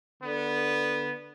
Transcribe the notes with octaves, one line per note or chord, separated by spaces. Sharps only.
D3 B3